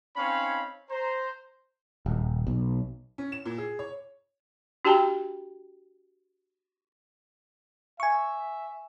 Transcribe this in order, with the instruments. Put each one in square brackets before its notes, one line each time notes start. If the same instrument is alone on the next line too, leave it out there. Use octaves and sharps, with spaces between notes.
[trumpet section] C4 C#4 D#4 C#5 F5 B5
C5 A#5
[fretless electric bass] D#1
B1
[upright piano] C#4
E7
A#2
G#4
C#5
[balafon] D4 F#4 G4 G5 A5 A#5
[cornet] E5 [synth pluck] G#5 C#6